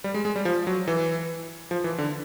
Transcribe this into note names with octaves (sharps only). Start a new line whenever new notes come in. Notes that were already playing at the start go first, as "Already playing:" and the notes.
G3
G#3
G#3
G3
F3
F#3
E3
F3
E3
D3